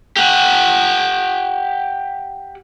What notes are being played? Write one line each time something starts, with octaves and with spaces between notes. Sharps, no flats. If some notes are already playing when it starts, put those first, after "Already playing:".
G4 F#5